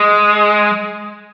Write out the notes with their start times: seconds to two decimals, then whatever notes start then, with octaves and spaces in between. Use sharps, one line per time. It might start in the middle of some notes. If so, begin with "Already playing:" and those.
Already playing: G#3